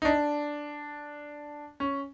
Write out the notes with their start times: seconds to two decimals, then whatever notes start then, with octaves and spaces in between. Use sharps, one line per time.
0.02 D#4
0.05 D4
1.80 C#4